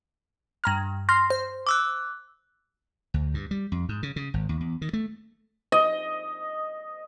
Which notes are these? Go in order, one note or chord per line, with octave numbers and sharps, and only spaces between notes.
G2 A#5 F6
C6 F6 A#6
C5
D6 E6 F#6
D2
G2
G3
F2
G#2
C#3
C#3
G#1
D#2
E2
D#3
A3
D#5